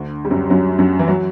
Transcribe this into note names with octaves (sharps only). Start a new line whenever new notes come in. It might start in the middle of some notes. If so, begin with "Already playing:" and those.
Already playing: D2 D3
G3
F#2 F#3
F#2 F#3
F#2 F#3
E3
F#3